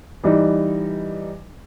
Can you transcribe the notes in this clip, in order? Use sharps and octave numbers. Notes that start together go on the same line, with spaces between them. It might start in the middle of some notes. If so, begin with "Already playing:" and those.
E3 G3 D#4